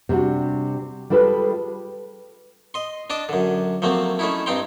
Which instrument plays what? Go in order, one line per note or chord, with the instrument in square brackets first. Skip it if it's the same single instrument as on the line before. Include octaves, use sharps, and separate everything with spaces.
[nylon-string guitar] C3 G3 D4 F#4
G3 G#3 F4 A4 B4
[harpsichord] D#5 C6
D4 D#5 A5 D6
F#2 D3
F3 F#3 A3 A#3 C4
A3 C#4 D#4 E4
G2 C4 D#4 G5 A#5 C6